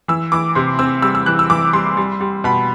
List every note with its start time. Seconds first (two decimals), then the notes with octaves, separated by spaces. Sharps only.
0.08 E3 E6
0.32 E3 D6
0.55 C3 C6
0.79 C4 E6
1.02 G3 E6
1.15 E6
1.26 E3 F#6
1.39 E6
1.50 E3 D6
1.73 G3 C6
1.97 G3
2.20 G3
2.44 B2 B5